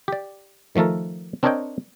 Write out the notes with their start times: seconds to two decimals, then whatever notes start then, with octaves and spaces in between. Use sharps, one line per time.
0.08 G4 D5
0.76 D#3 F3 A3 A4 A#4
1.43 C4 D4 A#4 C#5 D#5 G5